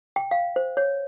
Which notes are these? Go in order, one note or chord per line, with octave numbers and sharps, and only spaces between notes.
G5
F5
C5
C#5